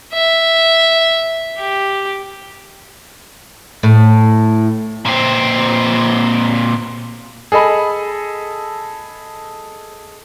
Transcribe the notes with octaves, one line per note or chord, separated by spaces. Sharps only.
E5
G4
A2
A#2 C4
G#4 A4 D#5 B5